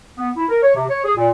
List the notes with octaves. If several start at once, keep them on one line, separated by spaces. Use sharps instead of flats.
B3
E4
A#4
C#5
C3
C#5
G#4
A#2